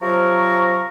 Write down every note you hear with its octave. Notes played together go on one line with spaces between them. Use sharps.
C3 F3 F#3 A#4 A#5 C#6